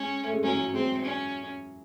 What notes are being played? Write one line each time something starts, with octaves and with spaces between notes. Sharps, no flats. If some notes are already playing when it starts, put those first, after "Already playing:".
Already playing: G#3 C#4
A3
G#3
F#3 C#4
E3
F#3
G#3 C4
C#4